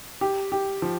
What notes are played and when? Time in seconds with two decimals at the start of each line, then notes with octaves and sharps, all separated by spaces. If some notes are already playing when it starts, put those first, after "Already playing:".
0.21 G4
0.52 G4
0.82 F3